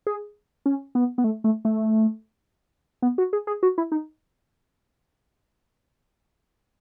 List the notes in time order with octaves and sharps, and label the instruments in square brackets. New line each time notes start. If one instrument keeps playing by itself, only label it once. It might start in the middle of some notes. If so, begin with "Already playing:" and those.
[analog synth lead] G#4
C#4
B3
B3
A3
A3
A3
B3
F#4
G#4
G#4
F#4
E4
D#4